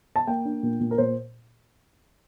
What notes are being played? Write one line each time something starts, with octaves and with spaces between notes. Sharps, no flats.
A5
A#3 G5
D4
A#2
A#2
A#4
A#2 C5